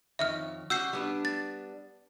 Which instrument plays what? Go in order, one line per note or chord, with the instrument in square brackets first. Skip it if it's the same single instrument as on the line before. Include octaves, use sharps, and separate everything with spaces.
[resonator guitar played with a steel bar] F2 D#3 C#5 [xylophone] E5 F6
[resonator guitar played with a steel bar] G3 C#4 F#4 [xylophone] E6 G6 C7
[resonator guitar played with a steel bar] G3 B3 D4
[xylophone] A6